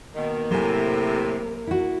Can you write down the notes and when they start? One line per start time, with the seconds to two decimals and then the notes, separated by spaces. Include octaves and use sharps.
0.15 B2 D#3 A#3 A#4
0.50 A2 C3 F#3 G#5
1.67 E4 F#4